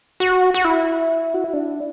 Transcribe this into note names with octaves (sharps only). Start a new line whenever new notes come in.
F#4
F#4
E4
F#4
E4
D4